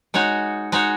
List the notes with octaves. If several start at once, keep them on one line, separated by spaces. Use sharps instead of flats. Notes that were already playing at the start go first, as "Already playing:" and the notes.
G#3 D#4 F#4 C#5
G#3 D#4 F#4 C#5